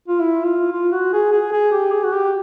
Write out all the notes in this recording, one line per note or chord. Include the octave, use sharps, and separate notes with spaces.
F4
E4
F4
F4
F#4
G#4
G#4
G#4
G4
G#4
F#4
G4